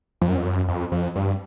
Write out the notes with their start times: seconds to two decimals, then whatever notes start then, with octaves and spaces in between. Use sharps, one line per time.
0.22 F2
0.29 F#2
0.37 F2
0.45 F#2
0.68 F2
0.92 F2
1.16 G2